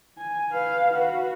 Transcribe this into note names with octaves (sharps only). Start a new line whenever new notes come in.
G#5
B4 F5
F#4 B4